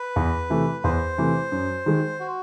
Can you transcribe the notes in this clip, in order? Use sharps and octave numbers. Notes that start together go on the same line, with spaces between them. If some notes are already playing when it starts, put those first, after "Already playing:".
Already playing: B4
E2
C3 E3 A3
E2 C5
C3 E3 A3
F#2
D#3 G#3
F#4